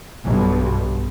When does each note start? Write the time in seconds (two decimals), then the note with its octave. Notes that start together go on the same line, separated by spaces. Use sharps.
0.23 B1 G2 B2